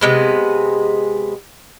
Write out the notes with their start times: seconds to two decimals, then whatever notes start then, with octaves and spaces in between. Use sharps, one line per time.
0.01 C3 G#3 B3